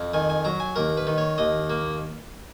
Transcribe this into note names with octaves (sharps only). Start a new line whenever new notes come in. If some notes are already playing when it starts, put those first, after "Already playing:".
Already playing: F2
D#3 G#5
G#5
F#3 A#5
G#5
D#2 A#4
B4
D#3
C#5
D#2 D#5
A#3